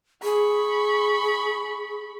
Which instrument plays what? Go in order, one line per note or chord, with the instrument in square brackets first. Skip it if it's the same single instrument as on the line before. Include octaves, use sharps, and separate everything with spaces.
[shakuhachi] G#4 [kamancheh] B5 C#6